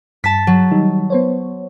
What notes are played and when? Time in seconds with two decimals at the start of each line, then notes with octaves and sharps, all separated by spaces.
0.24 G2 A5 A6 B6
0.47 F#3
0.72 D#3 G3 D#4
1.10 B3 C5 C#5